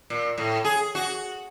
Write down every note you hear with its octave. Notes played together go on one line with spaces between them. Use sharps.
A#2
A2
G#4
F#4